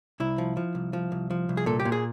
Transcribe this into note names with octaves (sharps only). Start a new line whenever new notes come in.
C2 E4
F3
F3
C2
F3
C2
F3
C2
G#4
A#2 A4
G4
A#2
G#4